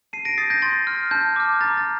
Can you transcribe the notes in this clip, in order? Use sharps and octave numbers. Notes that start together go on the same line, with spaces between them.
A5 C7 D#7
A#6 D7
D#6 G6 A6 C7
G6 A#6
C6 A6
F6
A5 G6
D6 F6
A#5 A6
A6